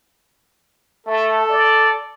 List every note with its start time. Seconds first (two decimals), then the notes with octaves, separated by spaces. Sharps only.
1.07 A3 A4
1.51 D5